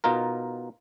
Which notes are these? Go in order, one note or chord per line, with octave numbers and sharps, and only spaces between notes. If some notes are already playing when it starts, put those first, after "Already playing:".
B2 D#4 F4 A#4